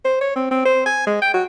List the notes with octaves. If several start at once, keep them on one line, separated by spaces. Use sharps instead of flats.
C5
C#5
C4
C4
C5
G#5
G#3
G5
F#4